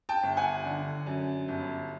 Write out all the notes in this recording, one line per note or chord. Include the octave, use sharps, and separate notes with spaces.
G5 A5
G1
F#5 G#5
D3
F#2
G1